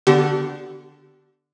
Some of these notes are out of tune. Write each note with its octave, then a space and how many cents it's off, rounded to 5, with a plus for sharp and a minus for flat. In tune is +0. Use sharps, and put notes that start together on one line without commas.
D3 +0 B3 +0 G4 -35